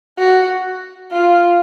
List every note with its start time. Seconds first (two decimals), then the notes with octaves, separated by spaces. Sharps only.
0.19 F#4
1.12 F4